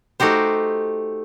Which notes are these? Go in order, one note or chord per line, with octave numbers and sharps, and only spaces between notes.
A3 D#4 F#4 G4 C5